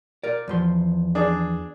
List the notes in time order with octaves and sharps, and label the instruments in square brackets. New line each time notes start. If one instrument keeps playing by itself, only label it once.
[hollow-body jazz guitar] A#4 D5
E2 F3 C6
[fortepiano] D4 G#4